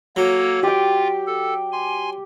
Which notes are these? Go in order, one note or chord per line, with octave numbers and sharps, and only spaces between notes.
F#3 A#3 A4 C#5
F4 G4 G5
A4
G#5 C6